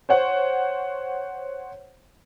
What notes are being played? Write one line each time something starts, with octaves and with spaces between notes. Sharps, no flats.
C5 C#5 F#5